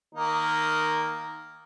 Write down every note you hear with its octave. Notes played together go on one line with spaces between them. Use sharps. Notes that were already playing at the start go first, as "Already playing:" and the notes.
D#3 A#3 D#4